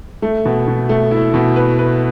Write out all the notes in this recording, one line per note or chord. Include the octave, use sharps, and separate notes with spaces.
A3
B2
B2
A3
E4
B2
B4
B4